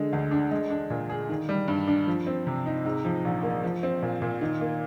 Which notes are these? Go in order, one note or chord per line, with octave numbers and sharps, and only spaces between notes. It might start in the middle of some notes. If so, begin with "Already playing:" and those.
Already playing: D3 G#3
D2
D4
G#3
D4
A#2
G#4
D#3
G3
G2
D4
F3
C4
C3
D#4
G#2
F3
A#1
A#3
F3
C4
A#2
A#2
D#3
A#3